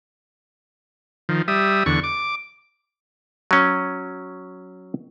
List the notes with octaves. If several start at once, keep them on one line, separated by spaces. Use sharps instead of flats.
D#3 F3
G3 E5 D#6
E2 D3 C#6
D6
F#3 C#4